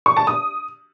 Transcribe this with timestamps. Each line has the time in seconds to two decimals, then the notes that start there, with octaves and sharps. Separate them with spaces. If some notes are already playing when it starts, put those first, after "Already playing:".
0.06 C#6
0.17 A5
0.27 D#6